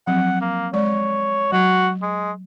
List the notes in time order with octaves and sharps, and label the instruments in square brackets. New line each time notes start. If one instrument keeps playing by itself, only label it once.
[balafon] F3 F#3 C4 [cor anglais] F#5
[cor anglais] A#3
[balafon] G#3 D5 [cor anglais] C#5
[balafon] F#3 [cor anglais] F#4
[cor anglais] G#3